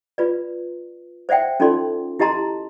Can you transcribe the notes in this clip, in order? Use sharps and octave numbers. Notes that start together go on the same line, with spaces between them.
F4 B4 D5
C5 D5 E5 F#5 G5
C#4 D#4 F4 A4 D5 C6
E4 G4 D#5 A5 A#5 C6